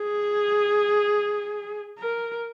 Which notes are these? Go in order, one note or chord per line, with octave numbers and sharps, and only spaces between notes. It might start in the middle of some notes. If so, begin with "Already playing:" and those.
Already playing: G#4
A#4